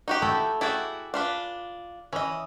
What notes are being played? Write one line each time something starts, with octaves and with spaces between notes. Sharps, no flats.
D#4 F#4 G4
A3 E4 G5
E4 F#4 G#4 D5 G5
D4 F4 B4
E3 C#4 D#5